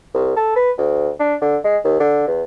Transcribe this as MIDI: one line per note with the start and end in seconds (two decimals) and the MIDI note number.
0.14 0.36 36
0.36 0.53 69
0.56 0.71 71
0.78 1.10 38
1.20 1.35 62
1.42 1.57 50
1.64 1.77 56
1.84 1.99 39
2.00 2.26 50
2.28 2.43 40